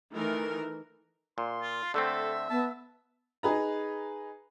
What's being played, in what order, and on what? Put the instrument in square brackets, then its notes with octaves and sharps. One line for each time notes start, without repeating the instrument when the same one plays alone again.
[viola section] D#3 E3 A3 A#4
[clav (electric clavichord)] A#2 [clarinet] C6
[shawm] F4
[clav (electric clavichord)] D3 A3 C4 [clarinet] A4 [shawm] E5
[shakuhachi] B3 [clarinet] A5
[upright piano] D#4 G#4 B4 A#5